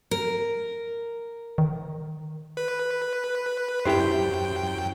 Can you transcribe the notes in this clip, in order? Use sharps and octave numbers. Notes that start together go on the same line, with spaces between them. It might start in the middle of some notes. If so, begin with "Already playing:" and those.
A#4
D#3
B4
F#2 E4 G4 C5 G5